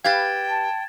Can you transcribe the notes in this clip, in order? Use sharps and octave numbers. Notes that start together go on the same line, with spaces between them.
G4 B4 F5 G5 G#6 A6 E7
A5